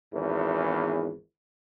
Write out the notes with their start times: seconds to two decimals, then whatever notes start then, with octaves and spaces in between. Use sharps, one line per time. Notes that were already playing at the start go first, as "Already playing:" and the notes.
0.12 G#1 E2